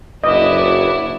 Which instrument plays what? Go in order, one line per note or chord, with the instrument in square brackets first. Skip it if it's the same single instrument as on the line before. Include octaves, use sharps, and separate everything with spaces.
[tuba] F#1 [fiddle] D4 E4 [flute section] F#4 B4 D6 [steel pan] D#5